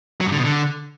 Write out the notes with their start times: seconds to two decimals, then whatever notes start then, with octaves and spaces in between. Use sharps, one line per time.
0.21 F#3
0.26 G2
0.32 D3
0.38 B2
0.44 D3